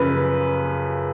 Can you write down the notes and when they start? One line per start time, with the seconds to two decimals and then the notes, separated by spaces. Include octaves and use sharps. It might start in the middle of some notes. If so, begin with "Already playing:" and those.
Already playing: F#2 C#3 F3 B4